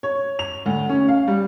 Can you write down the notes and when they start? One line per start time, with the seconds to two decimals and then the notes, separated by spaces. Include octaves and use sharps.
0.03 C#5
0.39 F7
0.66 D2
0.89 C#4
1.08 F5
1.28 G3